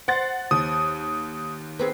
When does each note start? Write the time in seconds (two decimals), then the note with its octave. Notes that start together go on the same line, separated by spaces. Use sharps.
0.08 C5 F#5 A6
0.51 D#2 D#6
1.79 B3 C4 G#4